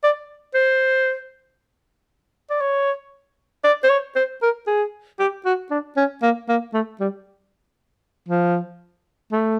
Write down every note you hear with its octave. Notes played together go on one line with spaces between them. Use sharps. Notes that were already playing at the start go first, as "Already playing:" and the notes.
D5
C5
D5
C#5
D5
C5
C#5
C5
A#4
G#4
G4
F#4
D4
C#4
A#3
A#3
A3
G3
F3
A3